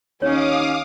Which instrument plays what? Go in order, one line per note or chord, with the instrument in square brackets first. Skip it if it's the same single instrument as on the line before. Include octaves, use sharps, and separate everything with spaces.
[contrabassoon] D#2 [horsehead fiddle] C#4 D#4 [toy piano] C#5 [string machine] F5 D6 D#6